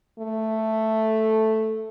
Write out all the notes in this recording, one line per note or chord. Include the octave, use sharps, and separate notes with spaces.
A3